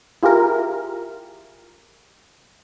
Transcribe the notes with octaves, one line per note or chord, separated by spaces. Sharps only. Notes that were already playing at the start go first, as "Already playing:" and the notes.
E4 F4 G4 G#4 A#4